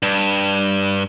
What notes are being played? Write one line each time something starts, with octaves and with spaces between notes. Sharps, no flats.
G2